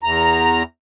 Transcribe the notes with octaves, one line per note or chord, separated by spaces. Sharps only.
E2 A#5